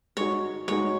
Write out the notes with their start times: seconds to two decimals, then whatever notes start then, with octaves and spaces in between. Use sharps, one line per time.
0.17 G#3 D#4 F#4 C#5
0.68 G#3 D#4 F#4 C#5